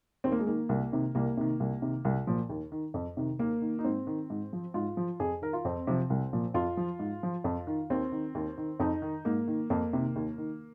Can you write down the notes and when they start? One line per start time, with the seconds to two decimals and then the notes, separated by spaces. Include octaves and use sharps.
0.24 D#2 C4
0.32 A#3
0.39 G#3
0.47 D#3 A#3
0.69 C2
0.92 C3 D#3
1.15 C2 A#3
1.37 C3 D#3
1.60 C2
1.82 C3 D#3
2.05 C2
2.27 A#2 F3
2.50 D#2
2.72 D#3
2.94 F2
3.17 C3 D#3
3.39 D#2 A#3
3.62 D#3
3.79 D#4
3.84 G#2 C4
4.07 D#3
4.30 G#2
4.53 F3
4.74 G#2 F4
4.97 F3
5.20 F2 G#4
5.42 D#3 A#4
5.53 F4
5.65 F2 C4
5.87 C3 F3
6.10 C2
6.33 A#2 F3
6.54 F2 F4
6.77 F3
6.99 G#2
7.23 F3
7.44 F2
7.67 D#3
7.90 D#2 C4
8.12 D#3
8.35 D#2
8.58 D#3
8.80 F2 D#4
9.02 D#3
9.25 G#2 A#3
9.48 D#3
9.70 F2 A#3
9.93 C3 D#3
10.16 D#2
10.38 D#3